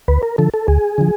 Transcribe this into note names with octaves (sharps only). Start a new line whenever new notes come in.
D2 B4
A#4
D3 F3 A4
A4
D2 G#4
D3 F3